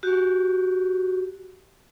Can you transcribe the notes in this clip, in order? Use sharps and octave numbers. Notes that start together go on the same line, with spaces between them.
F#4 G4